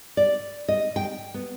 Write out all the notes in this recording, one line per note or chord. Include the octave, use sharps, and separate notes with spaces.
D5
D#5
G5
B3